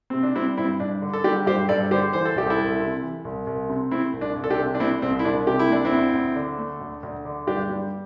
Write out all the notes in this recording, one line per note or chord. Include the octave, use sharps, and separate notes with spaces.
C3 C4
D4
G3 C4 E4
G2 C4 E4
G2 D4
D3
A4
G3 D4 G4
G2 G4 C5
G2 A4 D5
D3 G4 C5
E3 C5
A4
C2 G4
E4 A4
C2
C3
E3
C2
C2
C3
A3 C4 E4
C2
D4
C2
A4
D4 G4
C3
D4
A3 C4 E4
C2 C4
E4
C2 D4
C3 G4
E4
A3 D4
C4 E4
D2
D2
D3
A3
D2
D2
D3
G2 D4 G4
G3